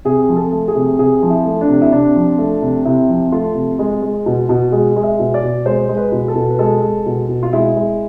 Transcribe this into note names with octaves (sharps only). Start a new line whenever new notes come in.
C3 G#4
F3
A4
A3
G#4
C3
C3 G#4
F3
E4
A3
D4
C3
E4
C3 D4
F3
A3
C3
C3 E4
F3
A3 F4
C3
G#3
G#3
B2
B2
G#3 G#4
G#3
E5
B2
D5
B2
G#3 C5
G#3
B4
B2
A4
B2
B4
G#3 A4
G#3
B2
B2
F4
G#3 E4
G#3